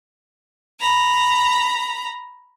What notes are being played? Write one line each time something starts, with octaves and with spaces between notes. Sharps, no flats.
A#5 B5